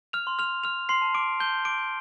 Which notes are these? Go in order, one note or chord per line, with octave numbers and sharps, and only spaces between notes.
F6 F7
C6
F6 F7
F6 F7
C6 C7
A5
D6 D7
A5 G6 G7
D6 D7
G6